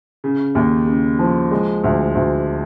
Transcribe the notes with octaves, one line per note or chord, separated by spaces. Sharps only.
C#3
D#2
C#3
F3
G#3
D2
D2